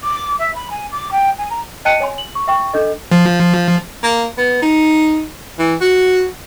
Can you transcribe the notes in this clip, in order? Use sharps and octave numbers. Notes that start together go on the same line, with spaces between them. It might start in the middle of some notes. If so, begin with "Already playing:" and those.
D6
E5
B5
G#5
D6
G5
G#5
A#5
D#5 G5 A5 F#6 C#7 D#7
C#5 G#5 C6
F#7
C#6
E5 G5 C#6
D4 A4 D#5
F3
A#3
B3
D#4
E3
F#4